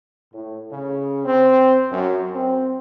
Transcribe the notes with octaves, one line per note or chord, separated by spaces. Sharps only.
A2
C#3
C4
F#2
C4